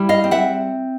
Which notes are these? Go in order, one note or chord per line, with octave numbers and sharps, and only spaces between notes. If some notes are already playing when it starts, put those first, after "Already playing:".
Already playing: G3 E4
D#5 F5
C4
E5 F#5